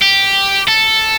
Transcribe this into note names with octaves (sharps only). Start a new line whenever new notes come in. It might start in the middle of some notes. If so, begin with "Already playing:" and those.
G4
A4